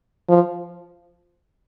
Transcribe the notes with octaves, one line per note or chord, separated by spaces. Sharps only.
F3